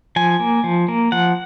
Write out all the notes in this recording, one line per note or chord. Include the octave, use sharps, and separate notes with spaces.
F3 G#5
A#3
F3
A#3
F3 F#5